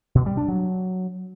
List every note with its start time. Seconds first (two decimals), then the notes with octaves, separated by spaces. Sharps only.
0.15 B2
0.26 G3
0.37 D4
0.48 F#3